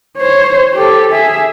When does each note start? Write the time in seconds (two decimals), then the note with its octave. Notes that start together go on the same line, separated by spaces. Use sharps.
0.18 C5 C#5
0.74 G4 A4
1.13 G#4 E5